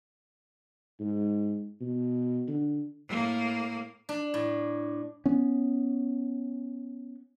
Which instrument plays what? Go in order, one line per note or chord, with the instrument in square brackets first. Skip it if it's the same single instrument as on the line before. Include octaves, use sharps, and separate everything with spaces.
[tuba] G#2
B2
D3
[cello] A2 A#3
[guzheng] D4
A2
[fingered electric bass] B3 C#4